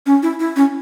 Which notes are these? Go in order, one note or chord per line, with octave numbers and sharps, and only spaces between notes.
C#4
E4
E4
C#4